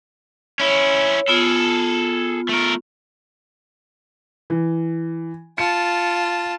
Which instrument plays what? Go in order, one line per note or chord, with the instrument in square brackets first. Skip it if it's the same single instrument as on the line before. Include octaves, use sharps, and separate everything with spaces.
[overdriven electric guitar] C#4 E4 [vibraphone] C#5
[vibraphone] B3 F4 [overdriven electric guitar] G#4 A4
[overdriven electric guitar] A3 A#4
[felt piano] E3
[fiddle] F4 A5 [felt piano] C#7